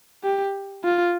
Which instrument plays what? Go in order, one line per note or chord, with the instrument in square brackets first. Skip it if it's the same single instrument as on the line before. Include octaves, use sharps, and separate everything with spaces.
[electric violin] G4
F4